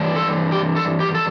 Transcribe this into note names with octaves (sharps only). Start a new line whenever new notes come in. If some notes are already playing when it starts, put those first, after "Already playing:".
Already playing: G2 E3 G3 D4
A4
G4
A4
G4
A4